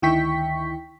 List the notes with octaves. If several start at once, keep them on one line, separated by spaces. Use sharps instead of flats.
D2 D#3 E4 G5 C#6 B6